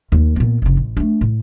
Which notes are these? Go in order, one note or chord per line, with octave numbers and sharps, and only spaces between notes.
D#2 D#3
A#2 B3
F#1 C#3
A1
A3 D4
A2